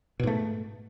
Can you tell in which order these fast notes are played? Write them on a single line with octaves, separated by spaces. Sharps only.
B2 G#2 A3